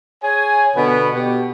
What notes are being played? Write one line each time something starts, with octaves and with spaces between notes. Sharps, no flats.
G#4 C#5 G#5
B2 D3 B3
B2 G4